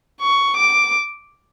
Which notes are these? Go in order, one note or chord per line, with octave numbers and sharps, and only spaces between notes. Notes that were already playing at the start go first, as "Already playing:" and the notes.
C#6
D6